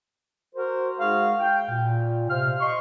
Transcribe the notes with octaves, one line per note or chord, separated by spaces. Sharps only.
F#4 A#4 C5
G#3 D#4 F#4 G#4 F5
G5
A#2
C3 C5 F5 F6
D#5 C6 C#6